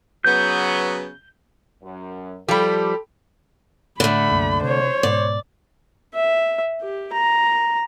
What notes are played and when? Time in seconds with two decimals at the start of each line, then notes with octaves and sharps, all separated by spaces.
0.25 C#3 F#3 B3 G6
1.83 F#2
2.48 F3 G3 G4 A4 B5
4.00 A2 D3 A3 B5
4.32 C2 F#2 A#3
4.63 C3 C5 C#5
5.03 G#2 B2 B3 D5
6.15 E5
6.81 G4
7.13 A#5